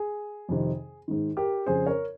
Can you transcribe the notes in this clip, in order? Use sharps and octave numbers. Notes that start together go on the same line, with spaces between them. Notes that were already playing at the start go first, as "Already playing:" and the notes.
Already playing: G#4
F2 C3 D#3
G#2 D#3
G4 A#4
F2 C#3 G#4 C5
A#4 C#5